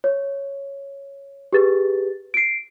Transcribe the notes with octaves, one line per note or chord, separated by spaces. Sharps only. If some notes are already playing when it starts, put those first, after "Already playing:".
C#5
G4 G#4 B4 A6
C7 D7